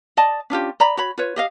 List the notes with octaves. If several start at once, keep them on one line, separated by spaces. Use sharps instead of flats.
D5 D#5 A5
C#4 D4 F4 G4
D5 A#5 B5
F#4 C#5 B5
F4 B4 C#5
G4 D#5 F5